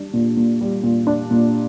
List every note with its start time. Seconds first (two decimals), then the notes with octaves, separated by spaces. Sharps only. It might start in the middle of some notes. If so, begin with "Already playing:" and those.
Already playing: G3 D4
0.14 A#2
0.37 A#2
0.61 G3
0.83 A#2
1.07 D4
1.31 A#2